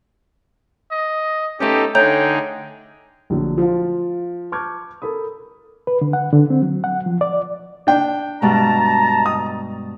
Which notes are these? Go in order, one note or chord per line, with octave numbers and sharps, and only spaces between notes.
D#5
A3 B3 C#4 D#4 G4 A4
D3 A3 D#4 G#4 C#5 G5 A#5 G6
A#1 A2 D3 F#3
F3 F4
A5 C#6 D6 F6 G6 G#6
A4 A#4 B5 D#6
B4
D3
F#5
D3
C4
F#3
F#5
F3
D5
D4 G5
G2 B2 G#3 A5 A#5
D#6